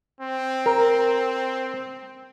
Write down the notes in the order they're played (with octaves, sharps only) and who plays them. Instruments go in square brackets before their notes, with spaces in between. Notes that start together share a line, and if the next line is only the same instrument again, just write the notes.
[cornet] C4
[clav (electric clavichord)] A#4